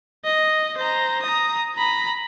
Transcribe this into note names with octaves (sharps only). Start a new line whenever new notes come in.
D#5
C5 A#5
A#5 D#6
A#5 B5